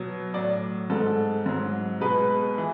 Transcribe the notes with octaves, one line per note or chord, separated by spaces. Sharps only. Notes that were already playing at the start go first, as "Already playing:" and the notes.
Already playing: B2 F#3
A2 F#3 D5
G#2 G#3 A4
G#2 F#3
B2 G#3 B4
E3